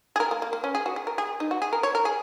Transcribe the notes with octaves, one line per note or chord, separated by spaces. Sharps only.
G#4
A#4
A#3
A#3
A#3
C#4
G#4
F#4
G#4
A#4
G#4
D#4
F#4
G#4
A#4
C#5
A#4
G#4